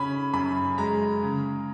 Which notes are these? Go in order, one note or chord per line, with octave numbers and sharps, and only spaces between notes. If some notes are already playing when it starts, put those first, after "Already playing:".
Already playing: C#3 C#4 B5
F#2 B5
G#3 A#5
C#3